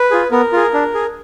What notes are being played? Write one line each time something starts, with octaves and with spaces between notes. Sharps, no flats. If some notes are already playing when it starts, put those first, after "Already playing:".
Already playing: B4
F4 G#4
B3 A#4
F4 G#4
D4
G#4